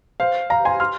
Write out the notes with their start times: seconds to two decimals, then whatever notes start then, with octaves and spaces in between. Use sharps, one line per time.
0.20 C5 F5
0.50 F5 A#5
0.65 G#5 C6
0.80 C6 F6